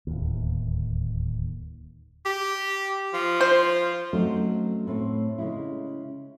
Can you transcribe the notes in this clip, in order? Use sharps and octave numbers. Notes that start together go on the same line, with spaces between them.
D1 D#2
G4
F3
C5
F#3 A3 C4 C#4 D#4
A2 C4
C#3 G#3 E4